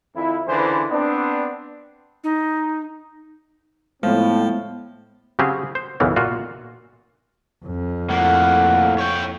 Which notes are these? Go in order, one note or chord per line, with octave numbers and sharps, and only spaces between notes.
F2 D#3 E4
C#2 D3 E3 B4 C5
B3 C4 D4
D#4
A2 F3 G#3 B3 C4
C#3 F#3 C4 G4 G#4
C5
B1 F#2 C#3 E3 B3
A#2 F4 F#4
F2
A2 A#3 F#5
C#5 G5